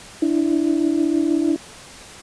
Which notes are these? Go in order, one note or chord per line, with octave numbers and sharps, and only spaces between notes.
D4 E4